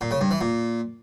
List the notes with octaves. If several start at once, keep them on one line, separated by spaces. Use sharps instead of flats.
A#2
C#3
G2
E3
A#2